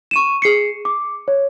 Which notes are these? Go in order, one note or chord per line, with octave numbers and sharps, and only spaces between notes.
C#6 D#7 E7
G#4 C7 C#7
D6
C#5